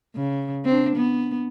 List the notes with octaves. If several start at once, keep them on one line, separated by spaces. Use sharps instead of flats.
C#3
C4 D4
B3